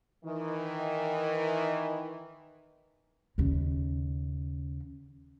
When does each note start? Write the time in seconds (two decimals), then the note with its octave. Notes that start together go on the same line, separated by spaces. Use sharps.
0.24 D#3 E3
3.38 D#2 C#3